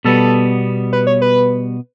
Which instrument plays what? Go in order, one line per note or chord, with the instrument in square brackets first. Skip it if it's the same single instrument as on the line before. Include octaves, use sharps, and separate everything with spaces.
[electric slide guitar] B2 G3 B3 [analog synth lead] A4
[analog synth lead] B4
C#5
B4